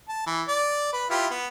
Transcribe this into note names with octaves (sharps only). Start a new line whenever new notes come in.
A5
E3
D5
B4
E4 F4 G4
B3